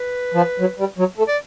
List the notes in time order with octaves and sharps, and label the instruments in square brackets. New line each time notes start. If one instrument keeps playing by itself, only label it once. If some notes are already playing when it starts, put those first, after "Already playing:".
Already playing: [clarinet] B4
[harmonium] F3
F#3
G3
F#3
A3
[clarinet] D5